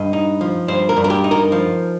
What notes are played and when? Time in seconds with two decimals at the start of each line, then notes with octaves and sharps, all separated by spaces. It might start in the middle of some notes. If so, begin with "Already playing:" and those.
Already playing: G2 D#5
0.13 D#4
0.41 F3
0.68 G2 C5
0.89 A#4
0.97 G2
1.04 A#4
1.10 G4
1.24 D#4
1.31 A#4
1.52 F3